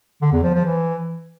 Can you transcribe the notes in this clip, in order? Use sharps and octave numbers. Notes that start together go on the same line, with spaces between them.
D3
E2
F3
F3
E3